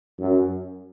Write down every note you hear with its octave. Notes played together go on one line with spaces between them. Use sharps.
F#2